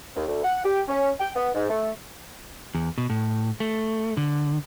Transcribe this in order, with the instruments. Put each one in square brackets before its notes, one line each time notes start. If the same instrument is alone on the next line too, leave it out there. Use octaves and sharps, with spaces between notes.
[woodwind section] D#2
D2
F#5
G4
C#4
G5
B3
G#2
A3
[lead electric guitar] E2
B2
A2
A3
D3